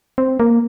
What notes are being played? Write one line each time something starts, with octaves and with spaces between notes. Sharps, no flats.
C4
A#3